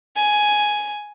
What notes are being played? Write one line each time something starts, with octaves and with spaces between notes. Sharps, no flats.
G#5